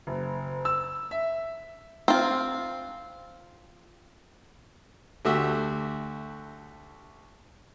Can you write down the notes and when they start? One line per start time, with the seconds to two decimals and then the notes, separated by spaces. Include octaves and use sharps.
0.07 F#1
0.65 E6
1.11 E5
2.08 C4 F4
5.25 D2 A3 F#4 G4 E5